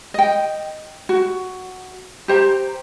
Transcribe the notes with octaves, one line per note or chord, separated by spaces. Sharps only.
D#5 G5
F#4
G4 C5 A#5